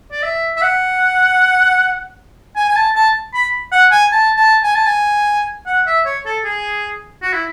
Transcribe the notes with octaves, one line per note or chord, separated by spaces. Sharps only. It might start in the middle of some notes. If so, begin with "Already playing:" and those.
D5
E5
E5
F#5
G#5
G#5
A5
A5
B5
F#5
G#5
A5
A5
G#5
A5
G#5
F#5
E5
C#5
A4
G#4
F#4
E4